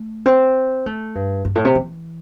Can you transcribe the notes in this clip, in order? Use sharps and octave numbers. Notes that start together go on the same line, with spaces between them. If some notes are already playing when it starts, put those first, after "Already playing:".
Already playing: A3
C4
A3
G2
G2
A2
C3
E3